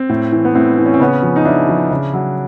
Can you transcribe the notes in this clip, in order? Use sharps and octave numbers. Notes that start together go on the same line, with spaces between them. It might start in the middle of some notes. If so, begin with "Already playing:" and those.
Already playing: C4
A2
E3
B3
A2 C4
E3
C#4
C4
C#3 B3 C#4
F3
D#4
C#3 D4 E4
F3
C#3
F#3